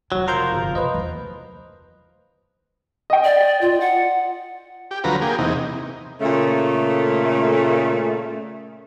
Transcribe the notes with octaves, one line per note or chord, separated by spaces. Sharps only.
F1 C#3 F#3
F3 A#4 A#5 C6 G6
G1
C#3 B4 C5 D#5
E2
D#5 G5
D5
F4
F#5
G4
D2 F3 F#3 B4 A#5
A#3 G4 G#4
E2 C3 D#4
A#2 C#3 A3